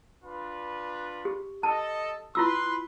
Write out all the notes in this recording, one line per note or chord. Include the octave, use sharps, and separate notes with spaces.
D4 F4 B4
G4
A4 D#5 A5
E4 F4 B4 C6 E6